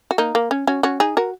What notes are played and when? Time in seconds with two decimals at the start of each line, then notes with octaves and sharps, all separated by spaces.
0.11 F#4
0.18 A#3 D#4
0.35 A#3
0.51 C#4
0.67 C#4 F#4
0.83 C#4 F#4
1.00 D#4 G#4
1.17 F#4 A#4